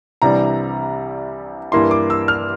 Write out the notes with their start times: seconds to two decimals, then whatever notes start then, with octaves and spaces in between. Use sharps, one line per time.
0.22 C2 C3 E3 G3 D4 A#5
1.72 G2 E3 A#3 E4 C6
1.91 D6
2.10 E6
2.28 F6